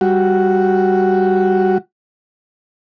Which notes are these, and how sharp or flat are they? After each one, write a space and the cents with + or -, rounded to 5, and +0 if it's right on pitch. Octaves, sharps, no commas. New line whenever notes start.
G3 +0 F#4 +0